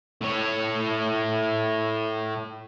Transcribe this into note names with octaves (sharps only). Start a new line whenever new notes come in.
A2 C#5